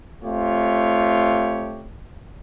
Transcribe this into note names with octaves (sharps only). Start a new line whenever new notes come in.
A3 C4 F4 G4 C#5